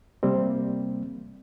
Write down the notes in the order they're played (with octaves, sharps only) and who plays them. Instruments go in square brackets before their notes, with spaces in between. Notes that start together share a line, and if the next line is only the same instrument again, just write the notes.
[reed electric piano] C3 G3 A#3 C4